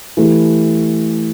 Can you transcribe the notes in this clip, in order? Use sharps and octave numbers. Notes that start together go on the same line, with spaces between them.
E3 A3 E4 G4